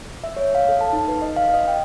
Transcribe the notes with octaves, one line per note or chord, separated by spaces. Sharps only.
E5
C#5
F5
A4
A5
D#4
B4
D#5
F5
D#5
G5